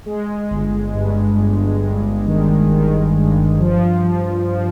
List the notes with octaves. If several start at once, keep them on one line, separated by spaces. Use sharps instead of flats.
G#3
G1
G2
G1
G2
D#3
D#3
G2
F3
F3
F3